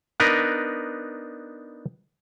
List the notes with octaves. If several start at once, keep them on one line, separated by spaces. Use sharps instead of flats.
B3 D4 D#4 A#4 B4